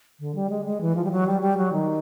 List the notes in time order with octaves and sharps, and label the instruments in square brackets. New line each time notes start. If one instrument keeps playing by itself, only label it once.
[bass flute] D3
G3
G#3
G#3
E3
F3
G3
F#3
G3
G3
F#3
D#3